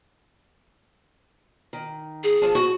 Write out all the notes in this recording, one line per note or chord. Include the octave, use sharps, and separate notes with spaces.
D#3
G#4
F3 A5
F#4